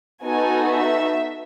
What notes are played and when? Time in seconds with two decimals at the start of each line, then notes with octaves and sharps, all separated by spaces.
0.23 B3 D#4 F#4 A4 G#5
0.72 E5